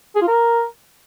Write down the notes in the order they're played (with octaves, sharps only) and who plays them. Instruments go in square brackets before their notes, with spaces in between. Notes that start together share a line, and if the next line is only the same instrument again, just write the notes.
[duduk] G#4
F4
A#4